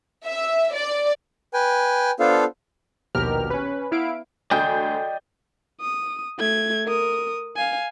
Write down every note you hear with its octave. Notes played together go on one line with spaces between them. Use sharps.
E5
D5
B4 G5 G#5
B3 D4 F4 A4 C5 F5
A#1 D#2 B2 G4 A#4 F6
C#4 B4
B3 E4 F5 D7
D2 D5 D#5 G5 G#5 G6
D#6
A3 G#6
A#4 D#6
F5 G#5